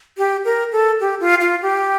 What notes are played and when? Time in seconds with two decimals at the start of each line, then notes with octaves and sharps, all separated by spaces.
0.18 G4
0.45 A#4
0.72 A4
1.00 G4
1.20 F4
1.41 F4
1.62 G4